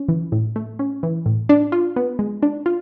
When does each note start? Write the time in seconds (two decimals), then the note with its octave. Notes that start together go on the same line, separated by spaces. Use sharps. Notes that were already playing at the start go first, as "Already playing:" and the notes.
Already playing: C#4
0.08 E3
0.32 A2
0.56 A3
0.79 C#4
1.03 E3
1.26 A2
1.49 D4
1.72 F4
1.96 B3
2.19 G#3
2.43 D4
2.66 F4